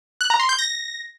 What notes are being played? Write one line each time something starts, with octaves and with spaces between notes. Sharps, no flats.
F#6
A#5
C6
G6
A#6